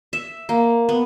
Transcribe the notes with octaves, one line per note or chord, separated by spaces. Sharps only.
E5
A#3
B3